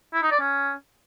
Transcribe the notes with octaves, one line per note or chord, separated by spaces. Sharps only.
E4
D#4
D5
C#4